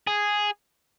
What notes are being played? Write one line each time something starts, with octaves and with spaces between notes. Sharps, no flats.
G#4